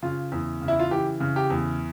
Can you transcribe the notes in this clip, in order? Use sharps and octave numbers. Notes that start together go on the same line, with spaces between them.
C#3 F4
E2
C#3
E4
F4
E3 G4
C#3
G4
E2